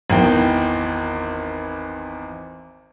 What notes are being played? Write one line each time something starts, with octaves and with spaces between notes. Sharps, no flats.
G#1 E2 G5